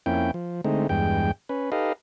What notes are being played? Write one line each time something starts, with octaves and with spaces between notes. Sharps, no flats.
F2 A#3 C#4 E4 G5
F3
D3 G#3 A3 C4 D#4
E2 G2 G#3 G5
C#4 B4
D#4 G4 A4 B4 D#5 F5